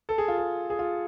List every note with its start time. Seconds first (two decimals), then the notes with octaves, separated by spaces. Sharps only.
0.09 A4
0.18 G#4
0.28 F4
0.38 G#4
0.70 G#4
0.79 F4